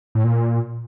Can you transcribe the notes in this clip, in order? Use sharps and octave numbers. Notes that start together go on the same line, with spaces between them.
A2
A#2